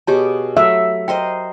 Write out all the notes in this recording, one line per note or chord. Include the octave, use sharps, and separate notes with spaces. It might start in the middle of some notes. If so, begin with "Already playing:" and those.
B2 G4 G#4 C#5 A5 D6
F#3 A3 E5
A#4 C5 D#5 G5